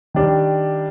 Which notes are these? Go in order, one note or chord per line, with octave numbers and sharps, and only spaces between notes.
D#3 G3 D4